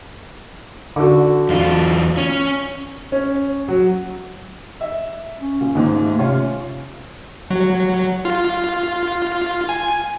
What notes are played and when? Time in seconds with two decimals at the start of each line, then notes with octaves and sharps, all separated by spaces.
0.96 D3 F#4
1.49 E2 F4
2.17 C#4
3.12 C#4
3.68 F#3
4.81 E5
5.41 C#4
5.61 A#2
5.75 D#2 G#2 A#3
5.92 A3
6.18 C3 C#4 F4 C#5
7.50 F#3
8.25 F4
9.69 G#5